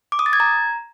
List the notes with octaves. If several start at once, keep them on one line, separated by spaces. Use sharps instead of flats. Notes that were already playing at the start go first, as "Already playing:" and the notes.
D6
D#6
A6
G#6
A#5